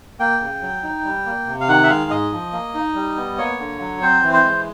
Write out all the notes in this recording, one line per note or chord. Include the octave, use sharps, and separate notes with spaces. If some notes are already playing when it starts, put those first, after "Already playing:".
A#3 G5
C#3
F#3
D#4
G3
A#3
C3
F5
D#3 F#5
E5
G#3 F5
G#2 D#5
F3
A#3
D#4
G3
B3
A#3 C#5
D3
F#3
C4 C5
E3
C5
G#3